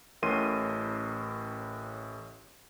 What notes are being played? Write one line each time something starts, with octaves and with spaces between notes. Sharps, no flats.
A1 A2 C#4 A#4 C6 D#7